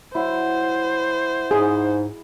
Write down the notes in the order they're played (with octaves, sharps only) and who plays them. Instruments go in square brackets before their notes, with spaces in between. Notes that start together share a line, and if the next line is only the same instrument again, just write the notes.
[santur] F#3 E4 [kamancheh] C5
[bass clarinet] G#2 [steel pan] G#4